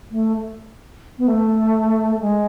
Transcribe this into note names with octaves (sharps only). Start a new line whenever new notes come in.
A3
B3
A3
G#3